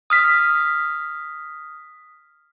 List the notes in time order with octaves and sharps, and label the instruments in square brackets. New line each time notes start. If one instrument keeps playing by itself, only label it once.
[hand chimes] D#6 F6 B6